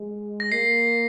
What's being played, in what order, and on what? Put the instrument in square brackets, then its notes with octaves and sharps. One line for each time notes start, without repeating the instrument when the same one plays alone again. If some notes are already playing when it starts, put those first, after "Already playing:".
Already playing: [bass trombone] G#3
[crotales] A#6
[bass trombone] A#3 [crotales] C7